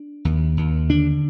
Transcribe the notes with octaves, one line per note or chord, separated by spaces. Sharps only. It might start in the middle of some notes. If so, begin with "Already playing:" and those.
Already playing: D4
D#2
D#2
D3 D4